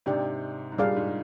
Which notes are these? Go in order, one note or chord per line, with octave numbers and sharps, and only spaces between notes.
G#2 C3 D4 G4 D5 G5
G#2
G2 A#2 G3 D4 G#4 D5 F5
G#2